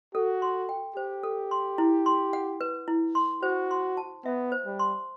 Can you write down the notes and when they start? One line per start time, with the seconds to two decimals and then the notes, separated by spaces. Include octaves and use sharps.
0.14 F#4 A4
0.42 C6
0.69 G5
0.96 G4 C5
1.23 A4
1.51 C6
1.78 E4
2.06 C6
2.33 F#5
2.61 B4
2.88 E4
3.15 C6
3.42 F#4 C5
3.71 C6
3.97 A5
4.25 B3 E5
4.52 C5
4.66 G3
4.79 C6